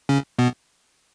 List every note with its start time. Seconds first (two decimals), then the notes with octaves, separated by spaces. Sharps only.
0.09 C#3 C#4
0.39 B2 B3